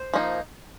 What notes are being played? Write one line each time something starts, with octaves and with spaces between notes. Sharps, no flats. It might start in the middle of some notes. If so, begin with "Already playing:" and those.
Already playing: C5
F3 A#3 D#4